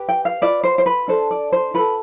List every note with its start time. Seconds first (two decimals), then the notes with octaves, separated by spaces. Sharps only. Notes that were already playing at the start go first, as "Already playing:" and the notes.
Already playing: G4 B4
0.09 G5
0.25 F5
0.42 F4 B4 D5
0.64 C5
0.78 C5
0.86 B4
1.08 D4 A4 C5
1.31 D5
1.52 C5
1.74 F4 A4 B4